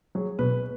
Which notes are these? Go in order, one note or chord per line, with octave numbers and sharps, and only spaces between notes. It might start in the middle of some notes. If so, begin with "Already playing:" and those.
F#3 G#4
B2 B4